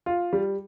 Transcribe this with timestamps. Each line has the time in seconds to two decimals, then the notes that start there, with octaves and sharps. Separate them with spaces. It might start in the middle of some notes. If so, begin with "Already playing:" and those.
0.06 F4
0.33 G3